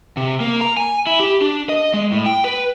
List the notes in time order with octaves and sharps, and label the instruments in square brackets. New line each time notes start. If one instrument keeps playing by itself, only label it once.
[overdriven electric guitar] C3
A#3
A#5
G#5
E4
G4
D4
D#5
G#3
A2
G5
B4